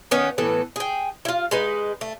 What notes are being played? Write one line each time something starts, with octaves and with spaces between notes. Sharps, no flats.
D#3 B3 C#4
A2 E3 B3 A4
G#4 G5
E4 F4
G#3 D#4 B4
A3